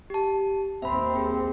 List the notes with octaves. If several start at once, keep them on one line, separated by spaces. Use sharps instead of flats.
G4 A5
D#2 C4 E5 B5
G#4